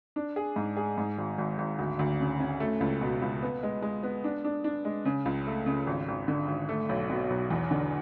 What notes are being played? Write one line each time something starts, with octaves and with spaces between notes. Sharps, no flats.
D4
G#4
G#2
G#4
G#2
G#1
G#1
G#1
D2
D2
C#3
C#4
A3
C#2
B2
C#2
B3
G#3
G#3
B3
D4
D4
D4
G#3
C#3
C#2
A3
C#3
G#1
G#1
D3
G#1
A3
B1
B2
B1
E2
D3